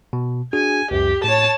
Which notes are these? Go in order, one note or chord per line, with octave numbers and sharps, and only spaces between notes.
B2
D4 F#4 G#4 G#5
C#2 F#2 G4
A2 C#5 A5